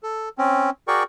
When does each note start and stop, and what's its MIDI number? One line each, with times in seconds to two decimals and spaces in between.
0.03 0.29 69
0.38 0.70 60
0.38 0.70 61
0.88 1.03 66
0.88 1.03 68
0.88 1.03 70
0.88 1.03 74
0.88 1.03 79
0.88 1.03 85